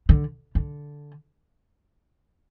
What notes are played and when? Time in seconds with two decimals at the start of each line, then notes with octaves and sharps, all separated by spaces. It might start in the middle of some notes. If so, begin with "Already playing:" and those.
0.09 D3
0.55 D3